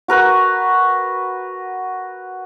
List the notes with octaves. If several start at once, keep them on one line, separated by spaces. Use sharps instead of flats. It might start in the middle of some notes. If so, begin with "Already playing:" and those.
F#4 A#4 B4